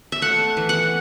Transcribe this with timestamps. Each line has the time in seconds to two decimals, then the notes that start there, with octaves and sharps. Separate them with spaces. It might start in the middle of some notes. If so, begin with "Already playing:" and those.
0.12 E5
0.22 A3 F#5
0.57 E3
0.69 F#5